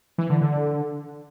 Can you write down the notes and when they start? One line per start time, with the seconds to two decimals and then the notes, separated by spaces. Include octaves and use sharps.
0.18 E3
0.30 D3
0.41 D3